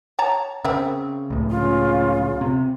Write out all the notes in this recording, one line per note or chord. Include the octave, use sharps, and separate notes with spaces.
C#5 A5 A#5
C#3 C4 A#4 E5
C#2 A2
C#3 F4
C3